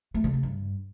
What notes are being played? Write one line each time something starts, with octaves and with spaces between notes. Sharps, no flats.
A3
D3
C#3
G2